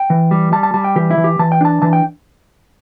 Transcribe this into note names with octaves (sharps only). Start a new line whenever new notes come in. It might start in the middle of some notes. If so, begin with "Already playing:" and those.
Already playing: G5
E3
G3
G3 A5
A5
G3 A5
G5
E3 G4
E4
E3
G4
E3 A5
G5
D4 A5
E3 A5
G5